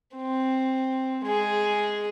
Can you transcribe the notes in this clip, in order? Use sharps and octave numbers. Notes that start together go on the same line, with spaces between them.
C4
G#3 G#4